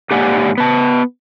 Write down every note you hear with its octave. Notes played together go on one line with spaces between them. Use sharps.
G#2 A#3 G4 D5 F#5 G#5
B3 A5